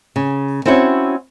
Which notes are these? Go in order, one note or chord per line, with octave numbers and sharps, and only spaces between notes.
C#3
C4 C#4 E4 F#4 C#5